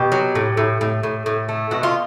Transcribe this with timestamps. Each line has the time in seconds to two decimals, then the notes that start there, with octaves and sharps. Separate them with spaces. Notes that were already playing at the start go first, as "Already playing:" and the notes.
Already playing: B2 G4
0.12 F#3
0.35 A2
0.57 A2
0.81 A2
1.03 A2
1.26 A2
1.49 A3
1.71 B2 F#4
1.83 F4